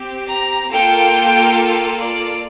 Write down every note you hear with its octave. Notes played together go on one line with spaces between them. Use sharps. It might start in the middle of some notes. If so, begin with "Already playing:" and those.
Already playing: C4 G4
A#5
A#3 F4 A4 G5
D5